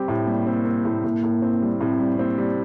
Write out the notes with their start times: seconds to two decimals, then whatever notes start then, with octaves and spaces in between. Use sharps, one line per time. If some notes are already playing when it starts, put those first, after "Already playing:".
Already playing: G3 C4 G4
0.08 A2
0.27 G3 A#3
0.47 C4
0.65 C4
0.85 A2
1.04 A2 A#3
1.24 A2
1.42 C4
1.62 G3
1.81 A2 C4
2.00 G3
2.19 A#3 C4
2.38 G3